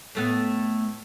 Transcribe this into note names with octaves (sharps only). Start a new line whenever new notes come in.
A2 A3 B3